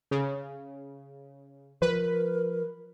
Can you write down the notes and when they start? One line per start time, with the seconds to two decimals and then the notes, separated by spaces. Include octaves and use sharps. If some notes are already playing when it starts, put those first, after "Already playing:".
0.11 C#3
1.82 F3 A#4 B4